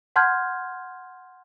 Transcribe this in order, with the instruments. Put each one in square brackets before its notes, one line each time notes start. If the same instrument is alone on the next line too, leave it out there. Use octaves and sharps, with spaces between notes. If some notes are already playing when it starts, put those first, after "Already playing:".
[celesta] F#5 A5 C6 F6 G6 G#6